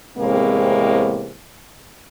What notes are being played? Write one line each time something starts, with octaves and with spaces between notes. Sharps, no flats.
E2 A2 C3 G#3 A#3 C4